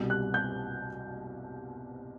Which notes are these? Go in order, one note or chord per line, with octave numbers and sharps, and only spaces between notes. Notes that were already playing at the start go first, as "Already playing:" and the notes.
Already playing: C2 B2 G3
F#6
G6